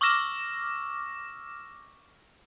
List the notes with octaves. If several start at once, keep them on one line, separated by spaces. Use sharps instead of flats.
C#6 D6 E6 F6 A#6 E7